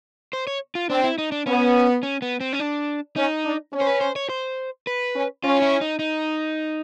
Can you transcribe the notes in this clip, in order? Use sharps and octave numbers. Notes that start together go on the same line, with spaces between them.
C5
C#5
F4
C4 D4
E4
D#4
D4
B3 C#4
C#4
B3
C4
C#4
D4
C#4 D#4
D4
C#4
C5
B4
C5
C#5
C5
B4
C#4
C#4 F4
E4
D#4
D#4